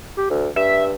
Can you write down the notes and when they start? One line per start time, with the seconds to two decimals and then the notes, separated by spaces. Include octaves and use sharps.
0.17 G4
0.30 D2
0.56 G2 E5